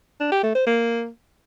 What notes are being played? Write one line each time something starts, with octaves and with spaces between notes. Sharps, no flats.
D4
G4
A3
C5
A#3